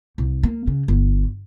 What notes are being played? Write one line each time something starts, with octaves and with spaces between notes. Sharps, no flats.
C2
A#3
C#3
G1